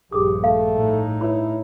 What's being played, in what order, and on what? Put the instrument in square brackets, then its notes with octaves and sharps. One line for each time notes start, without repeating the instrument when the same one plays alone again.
[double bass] A#1 G2 [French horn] G4 [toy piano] G#4 D#6
[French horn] A3 [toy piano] F5
[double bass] A2 D#4
[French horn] E4 [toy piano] B4 C#5 B5